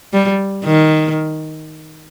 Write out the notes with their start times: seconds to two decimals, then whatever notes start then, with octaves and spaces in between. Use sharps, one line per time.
0.13 G3
0.65 D#3